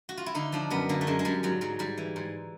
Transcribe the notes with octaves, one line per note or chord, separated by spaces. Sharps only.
F#4
F4
E4
D3 D#4
F3 D4
F#2 B3
D3 A#3
A3
F#2 G#3
G#3
F#2 G3
G#2 F#3
G#2 F#3
G#2 G3
E3
G#2